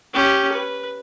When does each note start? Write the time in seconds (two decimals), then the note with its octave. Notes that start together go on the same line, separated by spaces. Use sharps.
0.13 C#4 G4
0.52 B4